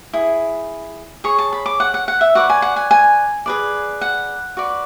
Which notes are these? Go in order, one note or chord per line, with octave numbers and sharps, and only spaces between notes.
E4 G#4
G#4 C#5 C#6
A5
B5
D6
F#5
F#5
F#5
E5
F#4 B4 D5 F#5
G#5
F#5
G#5
G#5
G#4 B4 D5
F#5
F#4 B4 D5